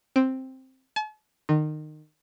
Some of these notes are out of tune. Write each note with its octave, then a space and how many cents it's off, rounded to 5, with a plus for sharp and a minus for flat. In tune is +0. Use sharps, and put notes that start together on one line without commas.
C4 +5
A5 -45
D#3 -25